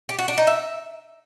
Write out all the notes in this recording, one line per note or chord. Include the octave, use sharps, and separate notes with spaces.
G4
F#4
D4
D#4
E5